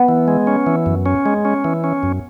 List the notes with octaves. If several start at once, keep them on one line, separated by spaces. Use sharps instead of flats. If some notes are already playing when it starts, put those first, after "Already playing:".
Already playing: B3
E3
G#3
C#4
E3
F#2
C#4
G#3
C#4
E3
C#4
F#2